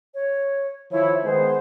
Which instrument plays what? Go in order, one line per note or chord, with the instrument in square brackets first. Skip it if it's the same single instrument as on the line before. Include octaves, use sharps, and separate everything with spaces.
[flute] C#5
[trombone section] D#3 F3 E4 [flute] C#5
[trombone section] D#3 G#3 B3 [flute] C5